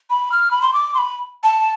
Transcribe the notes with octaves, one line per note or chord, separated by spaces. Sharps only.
B5
F6
B5
C6
D6
C6
B5
A5